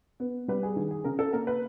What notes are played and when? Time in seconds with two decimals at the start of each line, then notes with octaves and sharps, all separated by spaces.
0.20 B3
0.48 G3 B4
0.63 G#4
0.76 D#3 G#4
0.91 G#4
1.04 C#3 A#4
1.19 A4
1.33 A#3 A#4
1.47 B4